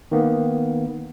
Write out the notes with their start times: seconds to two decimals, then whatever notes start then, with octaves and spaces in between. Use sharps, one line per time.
0.12 D#3 A#3 B3